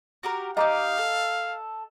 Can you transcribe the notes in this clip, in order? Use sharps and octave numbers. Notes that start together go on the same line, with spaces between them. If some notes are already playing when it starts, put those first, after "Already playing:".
F#4 G4 A#4
D#4 F4 G4 D#5 F5 A#5 D6
A4